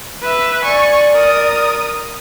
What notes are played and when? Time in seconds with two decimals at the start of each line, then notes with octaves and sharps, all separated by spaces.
0.22 B4 E5
0.64 D5 G#5 C#6
1.12 A#4 D#6